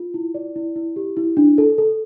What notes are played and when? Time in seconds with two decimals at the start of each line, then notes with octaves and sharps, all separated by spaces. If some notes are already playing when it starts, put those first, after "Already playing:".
Already playing: F4
0.14 E4
0.35 D5
0.56 E4
0.76 E4
0.96 G4
1.17 E4
1.37 D4
1.58 A4
1.78 A4